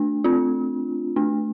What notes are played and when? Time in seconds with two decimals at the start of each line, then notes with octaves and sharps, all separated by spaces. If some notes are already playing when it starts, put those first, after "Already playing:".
Already playing: A3 D4
0.24 C4 F4
1.16 A3 D4